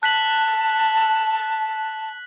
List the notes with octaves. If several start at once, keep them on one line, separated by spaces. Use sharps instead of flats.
A5 F#6 B6 F#7